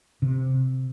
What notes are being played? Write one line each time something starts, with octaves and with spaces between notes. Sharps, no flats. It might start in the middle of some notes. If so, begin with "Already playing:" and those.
C3